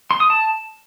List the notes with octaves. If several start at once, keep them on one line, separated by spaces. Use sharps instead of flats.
C6
D#6
A5